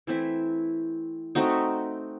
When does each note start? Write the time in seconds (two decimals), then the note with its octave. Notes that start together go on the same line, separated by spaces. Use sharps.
0.07 E3 A3 C4 E4
1.35 A3 C4 D#4 F#4